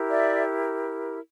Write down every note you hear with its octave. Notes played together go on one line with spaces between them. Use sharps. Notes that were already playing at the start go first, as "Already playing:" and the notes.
Already playing: E4 G4 A#4
D5 E5